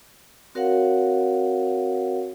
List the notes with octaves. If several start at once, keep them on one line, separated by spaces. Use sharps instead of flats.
C4 F#4 A#4 C#5 F5 F#5